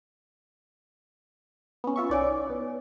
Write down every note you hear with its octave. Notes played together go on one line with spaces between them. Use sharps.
B3 C#4
F4 E5 C#6
C2 D#4 C#5 D5 G#5
B3